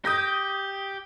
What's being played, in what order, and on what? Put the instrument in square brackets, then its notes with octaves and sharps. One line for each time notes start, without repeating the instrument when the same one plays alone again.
[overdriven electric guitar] G4 [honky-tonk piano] D#6 G6 A#6